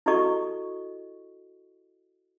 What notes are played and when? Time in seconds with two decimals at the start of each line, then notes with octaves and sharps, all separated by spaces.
0.06 E4 F#4 G4 A4 D#5 C#6